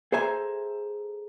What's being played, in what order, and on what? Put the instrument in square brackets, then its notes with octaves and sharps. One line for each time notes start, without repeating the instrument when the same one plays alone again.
[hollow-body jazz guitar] G#4 A4 C5 E5 G#5 A#5